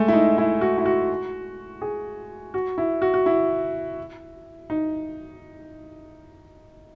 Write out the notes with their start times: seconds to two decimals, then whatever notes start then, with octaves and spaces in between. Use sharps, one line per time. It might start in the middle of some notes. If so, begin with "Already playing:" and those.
Already playing: G#3 A3
0.08 E4
0.13 D#4
0.38 E4
0.61 F#4
0.78 E4
0.86 F#4
1.81 G#4
2.54 F#4
2.78 E4
3.02 F#4
3.14 F#4
3.26 E4
4.70 D#4